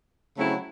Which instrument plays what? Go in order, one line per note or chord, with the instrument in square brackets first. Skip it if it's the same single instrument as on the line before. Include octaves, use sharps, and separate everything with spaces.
[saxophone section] C#3 F#3 A3 C4 E4